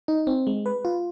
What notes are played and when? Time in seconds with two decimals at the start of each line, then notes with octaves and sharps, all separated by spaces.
0.08 D#4
0.27 C4
0.47 G#3
0.66 B4
0.85 F4